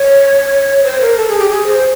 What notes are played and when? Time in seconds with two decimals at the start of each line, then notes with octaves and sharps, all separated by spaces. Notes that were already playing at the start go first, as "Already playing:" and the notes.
Already playing: C#5
0.84 C5
1.01 A#4
1.17 A4
1.28 G#4
1.39 G4
1.50 G#4
1.67 C5